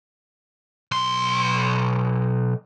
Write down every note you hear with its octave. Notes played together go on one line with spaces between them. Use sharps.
B1 C6